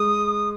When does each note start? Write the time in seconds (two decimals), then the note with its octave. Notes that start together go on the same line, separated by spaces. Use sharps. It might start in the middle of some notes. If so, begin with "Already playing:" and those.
Already playing: G#3 D#6